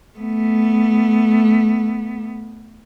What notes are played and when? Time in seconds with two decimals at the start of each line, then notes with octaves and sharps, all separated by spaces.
0.18 A3 B3